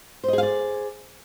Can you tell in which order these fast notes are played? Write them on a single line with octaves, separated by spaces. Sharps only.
C5 D#5 G#4 F5 D5